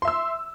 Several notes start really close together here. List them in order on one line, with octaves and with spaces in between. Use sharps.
C6 E5 E6